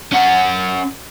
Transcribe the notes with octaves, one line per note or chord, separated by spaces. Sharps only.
C#4 F#5